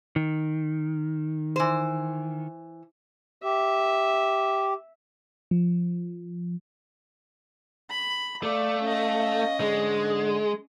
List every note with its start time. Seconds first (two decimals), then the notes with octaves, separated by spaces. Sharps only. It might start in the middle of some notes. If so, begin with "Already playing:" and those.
0.16 D#3
1.56 E3 C5
3.44 G4 E5
5.51 F3
7.90 B5
8.43 A3 D5 F5
8.83 C#4 D#5
9.60 G#2 D3 G#3